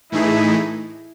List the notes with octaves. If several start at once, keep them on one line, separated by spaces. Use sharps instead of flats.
A2 E3 A3 D#4 E4 G#4